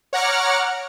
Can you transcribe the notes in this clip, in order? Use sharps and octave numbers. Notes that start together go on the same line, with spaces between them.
C#5 F#5 A#5 D6 F6